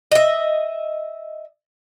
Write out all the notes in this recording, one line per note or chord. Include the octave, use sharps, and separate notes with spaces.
D#5 E5